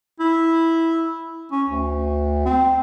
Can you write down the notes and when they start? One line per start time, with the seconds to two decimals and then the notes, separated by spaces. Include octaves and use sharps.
0.20 E4
1.52 C#4
1.69 D2
2.46 C4